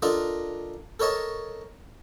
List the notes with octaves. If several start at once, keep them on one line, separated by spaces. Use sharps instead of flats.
D4 F4 A4 A#4 D#5
A4 A#4 C#5 D#5 A5